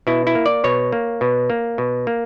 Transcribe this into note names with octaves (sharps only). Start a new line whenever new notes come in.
B2 E4
E4
A#3
D5
B2 C#5
A#3
B2
A#3
B2
A#3